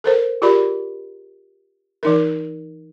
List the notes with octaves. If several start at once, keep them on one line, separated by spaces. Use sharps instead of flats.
A4 A#4 C5
F4 G4 G#4 A#4 D5 B5
E3 D#4 A#4